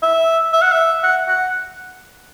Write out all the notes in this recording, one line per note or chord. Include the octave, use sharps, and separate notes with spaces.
E5
E5
F#5
E5
F#5
F#5